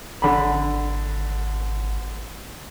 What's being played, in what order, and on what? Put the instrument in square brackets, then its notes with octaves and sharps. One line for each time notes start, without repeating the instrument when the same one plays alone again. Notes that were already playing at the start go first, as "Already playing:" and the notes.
[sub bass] G#1 [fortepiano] D3 B5